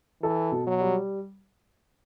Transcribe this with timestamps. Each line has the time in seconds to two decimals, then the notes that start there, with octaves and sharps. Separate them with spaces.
0.22 E3 A4
0.52 B2
0.67 F#3
0.81 G3